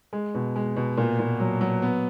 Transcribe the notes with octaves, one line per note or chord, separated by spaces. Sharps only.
G#3
B2
G#3
B2
A#2
A#2
F#3
F#3
B3